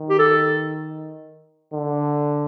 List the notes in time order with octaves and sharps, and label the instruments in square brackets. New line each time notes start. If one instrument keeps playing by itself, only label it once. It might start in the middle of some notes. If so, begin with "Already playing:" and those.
Already playing: [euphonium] D#3
[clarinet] G4
A4
[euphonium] D3